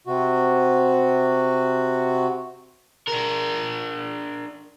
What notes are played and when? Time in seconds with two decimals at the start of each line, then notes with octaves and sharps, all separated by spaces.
0.07 C3 F#4
3.08 D4 A#4